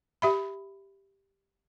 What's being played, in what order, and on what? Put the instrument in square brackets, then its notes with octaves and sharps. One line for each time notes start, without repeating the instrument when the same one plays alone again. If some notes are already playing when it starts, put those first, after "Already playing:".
[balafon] G4 E5 B5